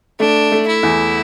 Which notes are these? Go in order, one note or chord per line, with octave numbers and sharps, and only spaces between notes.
A3 D4
A3
E4
E2